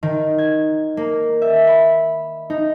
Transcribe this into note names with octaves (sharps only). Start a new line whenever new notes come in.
D#3
G#6
A#3
E5
B5
D#4